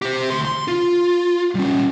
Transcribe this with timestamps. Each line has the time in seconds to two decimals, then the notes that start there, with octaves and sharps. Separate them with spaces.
0.02 G4 C5
0.30 D2 C6
0.45 C6
0.68 F4
1.55 G3 C#4